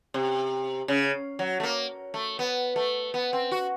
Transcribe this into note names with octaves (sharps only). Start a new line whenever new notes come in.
C3
C#3
F#3
A3
A#3
A3
B3
A3
B3
C4
F#4